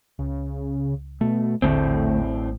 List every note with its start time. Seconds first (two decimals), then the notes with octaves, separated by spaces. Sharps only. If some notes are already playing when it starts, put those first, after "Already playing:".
0.19 C#2 C#3
1.21 B2 A3
1.62 D#1 A1 A2 D3 A3 C4